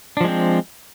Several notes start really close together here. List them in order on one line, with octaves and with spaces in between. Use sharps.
D4 F3 G#3 C4